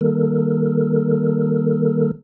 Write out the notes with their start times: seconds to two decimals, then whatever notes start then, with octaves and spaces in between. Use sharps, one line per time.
0.01 D#3 G3 A#3 A4 A#4